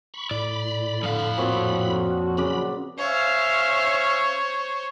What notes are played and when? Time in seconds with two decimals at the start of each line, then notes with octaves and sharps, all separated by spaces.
0.14 B5 C#6
0.31 A2 D5 B5
1.03 F2 D3 F5
1.37 A#2 C4 F#4 C#5
2.37 C#3 F#3 D5 B5
2.98 C#4 C5 C#5 E5 F5